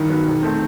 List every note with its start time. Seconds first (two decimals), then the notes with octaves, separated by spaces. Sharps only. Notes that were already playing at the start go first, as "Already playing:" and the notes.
Already playing: G2 D#3
0.10 F#3 B3
0.27 E1
0.43 D#3 A3 C4